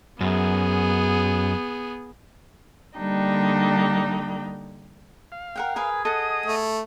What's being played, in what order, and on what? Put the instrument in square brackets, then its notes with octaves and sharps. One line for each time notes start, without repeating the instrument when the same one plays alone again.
[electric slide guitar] F#2 [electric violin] B3 G#4
[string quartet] D3 G3 A#3 D4 D#4 G5
[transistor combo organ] F5
[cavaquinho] A#4 F#5 G5
[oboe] G#4 [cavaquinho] A#4 B4 G#5
[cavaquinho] A4 F#5 [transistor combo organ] D#5 D#6
[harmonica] A3